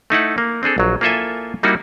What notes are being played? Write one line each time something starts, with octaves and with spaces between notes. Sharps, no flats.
A3 D#4 E4 F#5
A#3
C4 D4 G#4 A4
A#1 F#3
A#3 E4 F4 A4 E5 G#5
G3 A#3 D#4 E4 F#4